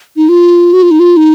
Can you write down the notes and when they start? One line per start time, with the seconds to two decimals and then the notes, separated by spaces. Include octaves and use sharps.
0.17 D#4
0.29 F4
0.73 F#4
0.82 F4
0.91 D#4
1.00 F4
1.17 D#4